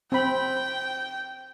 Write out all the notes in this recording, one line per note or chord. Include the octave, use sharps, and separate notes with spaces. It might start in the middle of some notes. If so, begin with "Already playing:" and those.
C4 G5 B5